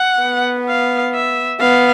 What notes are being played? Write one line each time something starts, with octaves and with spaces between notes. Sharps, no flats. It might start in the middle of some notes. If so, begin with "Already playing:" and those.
Already playing: F#5
B3
F5
E5
B3 F5